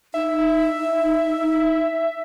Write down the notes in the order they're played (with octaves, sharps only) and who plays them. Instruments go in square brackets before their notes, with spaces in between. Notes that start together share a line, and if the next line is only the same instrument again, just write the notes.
[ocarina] D#4 [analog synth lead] E5